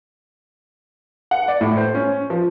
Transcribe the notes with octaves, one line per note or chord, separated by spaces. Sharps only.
F#5
D5
A2
C5
C#4
F3